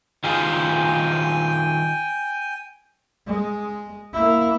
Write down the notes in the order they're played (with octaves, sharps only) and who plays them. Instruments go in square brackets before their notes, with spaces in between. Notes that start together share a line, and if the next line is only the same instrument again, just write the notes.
[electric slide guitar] D#3 F4 G#4 [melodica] G5 G#5
[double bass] G#3
A#3 E4